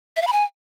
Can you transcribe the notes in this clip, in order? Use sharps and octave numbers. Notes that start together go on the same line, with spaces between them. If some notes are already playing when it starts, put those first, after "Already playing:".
E5
F5
B5
G#5